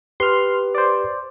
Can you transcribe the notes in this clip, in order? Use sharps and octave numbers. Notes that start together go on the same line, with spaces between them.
G4 B4 C6 F6
C5 D5